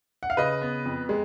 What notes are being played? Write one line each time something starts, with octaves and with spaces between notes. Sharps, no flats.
F#5
F5
C#3 B4 D#5
B3
F2
G#3